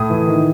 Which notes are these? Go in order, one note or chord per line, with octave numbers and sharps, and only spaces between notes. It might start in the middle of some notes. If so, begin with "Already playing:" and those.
Already playing: A2 D#6
E3
D#3